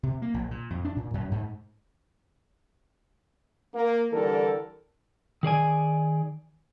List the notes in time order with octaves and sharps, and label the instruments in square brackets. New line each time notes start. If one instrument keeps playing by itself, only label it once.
[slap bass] C3
A#3
A#1
A#2
F2
D4
A#2
F#2
G#2
[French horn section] A#3
D3 E3 G3 A4 A#4
[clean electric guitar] D#3 G#4 D5 G#5